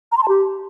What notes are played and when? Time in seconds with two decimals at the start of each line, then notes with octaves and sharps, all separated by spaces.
0.12 A#5
0.17 C6
0.23 A5
0.28 G4